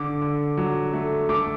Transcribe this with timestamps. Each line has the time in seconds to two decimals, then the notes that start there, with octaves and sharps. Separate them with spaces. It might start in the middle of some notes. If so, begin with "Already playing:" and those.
Already playing: D3 D6
0.21 D3
0.57 F#3
0.93 A3
1.29 A3 D6